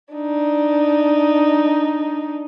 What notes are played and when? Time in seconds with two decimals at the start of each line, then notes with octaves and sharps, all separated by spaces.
0.14 D4 D#4